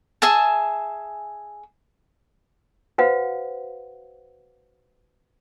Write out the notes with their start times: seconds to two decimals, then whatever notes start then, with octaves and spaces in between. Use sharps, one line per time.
0.22 G#4 E5 G#5 A5
2.98 F#4 B4 C5 F5 F#5